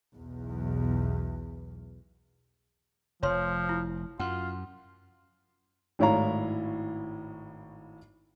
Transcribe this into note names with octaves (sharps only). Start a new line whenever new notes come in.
B1 E2
F1 F3 C#5 C6
E4
F#2 F4 F#5
G#1 A2 E4 C#5 F5 A#5